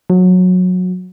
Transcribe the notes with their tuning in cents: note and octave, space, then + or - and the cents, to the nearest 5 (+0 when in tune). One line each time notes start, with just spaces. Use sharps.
F#3 -20